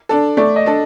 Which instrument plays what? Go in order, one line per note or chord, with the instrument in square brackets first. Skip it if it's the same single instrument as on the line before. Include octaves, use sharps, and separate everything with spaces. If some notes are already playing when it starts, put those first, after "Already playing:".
[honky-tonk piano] D4 A4
[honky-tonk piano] A3 [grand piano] D5
[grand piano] D#5
[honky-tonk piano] D4 A4